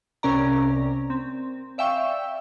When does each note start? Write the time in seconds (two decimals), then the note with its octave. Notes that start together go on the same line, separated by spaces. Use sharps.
0.23 C2 C3 C#4 A#4 D5 A#5
1.10 C4
1.78 D5 E5 F5 G5 C#6 E6